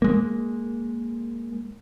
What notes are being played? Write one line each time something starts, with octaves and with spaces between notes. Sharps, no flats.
G#3 A#3